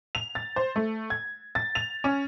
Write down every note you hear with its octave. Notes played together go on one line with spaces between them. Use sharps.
F7
A6
C5
A3
G#6
A6
F7
C#4